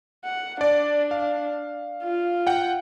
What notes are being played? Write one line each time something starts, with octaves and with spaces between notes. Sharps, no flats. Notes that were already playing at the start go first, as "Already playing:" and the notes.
F#5
D4 D5
F5
F4
F#5 G5